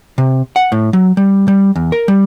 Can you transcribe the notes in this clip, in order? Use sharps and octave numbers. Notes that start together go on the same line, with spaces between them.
C3
F#5
A2
F#3
G3
G3
E2
A#4
G3